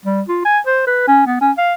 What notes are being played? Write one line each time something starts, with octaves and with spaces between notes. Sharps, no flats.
G3
F4
G#5
C5
B4
C#4
B3
C#4
F5